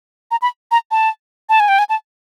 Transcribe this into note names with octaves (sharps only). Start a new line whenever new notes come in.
A#5
B5
A#5
A5
A5
G#5
G5
G#5
A5